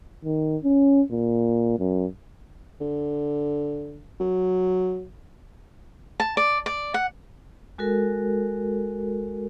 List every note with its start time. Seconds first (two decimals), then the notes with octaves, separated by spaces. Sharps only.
0.25 D#3
0.64 C#4
1.11 A#2
1.79 F#2
2.81 D3
4.20 F#3
6.20 A5
6.37 D5
6.66 D5
6.94 F#5
7.78 G#3 F#4 A4 A#4